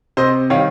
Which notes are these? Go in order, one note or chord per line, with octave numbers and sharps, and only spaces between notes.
C3 C5 D#5
D#3 G3 C#5 F5